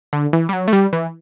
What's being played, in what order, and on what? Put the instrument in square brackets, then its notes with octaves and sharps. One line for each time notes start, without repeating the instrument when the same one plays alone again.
[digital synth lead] D3
E3
G3
F#3
A3
G3
E3